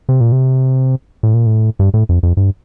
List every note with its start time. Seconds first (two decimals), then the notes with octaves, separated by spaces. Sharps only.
0.09 C3
0.21 A#2
0.32 C3
1.23 A2
1.34 A#2
1.46 A2
1.79 G2
1.94 A2
2.09 F2
2.23 F2
2.37 G2